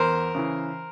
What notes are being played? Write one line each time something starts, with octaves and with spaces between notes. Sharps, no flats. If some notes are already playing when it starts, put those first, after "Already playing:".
Already playing: E2 A#4 C5
C#3 E3